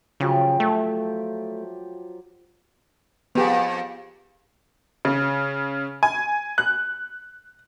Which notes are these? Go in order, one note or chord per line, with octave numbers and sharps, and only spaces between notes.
C#3 F3 F#3 G4
A3
F2 B3 G4 G#4
C#3
G#5
F#6